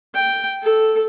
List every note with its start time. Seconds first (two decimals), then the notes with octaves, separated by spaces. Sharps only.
0.15 G5
0.63 A4